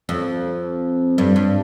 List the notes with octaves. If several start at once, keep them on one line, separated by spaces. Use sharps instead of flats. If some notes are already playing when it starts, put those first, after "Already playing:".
F2
G2
G2